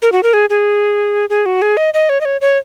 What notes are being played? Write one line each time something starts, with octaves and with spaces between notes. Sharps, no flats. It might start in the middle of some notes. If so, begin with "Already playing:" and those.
A#4
F#4
A#4
G#4
G#4
G#4
F#4
G#4
D#5
D#5
C#5
D#5
C#5
C#5